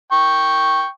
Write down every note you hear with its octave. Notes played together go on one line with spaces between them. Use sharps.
G5 C#6